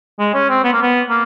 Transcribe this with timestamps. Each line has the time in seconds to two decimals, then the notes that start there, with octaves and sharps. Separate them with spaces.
0.19 G#3
0.34 C#4
0.49 C4
0.64 B3
0.73 A#3
0.82 B3
1.10 A#3